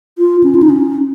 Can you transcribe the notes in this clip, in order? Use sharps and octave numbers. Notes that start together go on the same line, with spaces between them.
F4
C#4
F4
D#4
C#4